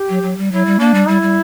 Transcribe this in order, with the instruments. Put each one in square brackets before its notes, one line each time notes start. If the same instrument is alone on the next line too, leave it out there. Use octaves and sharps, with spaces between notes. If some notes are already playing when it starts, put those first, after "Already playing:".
Already playing: [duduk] G4
[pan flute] F#3
F#3
G3
[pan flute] F#3 [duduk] E4
[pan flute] G3
[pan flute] A#3 [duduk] D4
[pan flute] G3
[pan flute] G3 [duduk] E4
[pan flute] G3